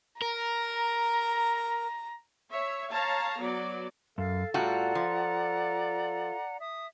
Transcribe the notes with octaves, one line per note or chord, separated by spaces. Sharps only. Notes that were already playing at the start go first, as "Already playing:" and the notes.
A#4 A#5
C#5 E5
C#5 F5 A5 A#5
F#3 B3 D5
F#2 A4 F5
A2 G3 F4 F#4 D5 F#5 A#5
F3
E5 D#6